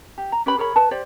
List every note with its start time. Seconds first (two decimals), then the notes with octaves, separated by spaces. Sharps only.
0.18 G4
0.32 A#5
0.46 C#4 G4 B4 B5
0.58 G#4 A#4 C#5 B5
0.76 B4 A5
0.91 G4 C5 D5